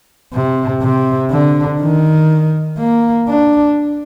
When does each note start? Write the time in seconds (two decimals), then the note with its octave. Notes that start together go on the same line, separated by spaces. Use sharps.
0.33 C3
0.82 C3
1.31 D3
1.81 D#3
2.79 A#3
3.28 D4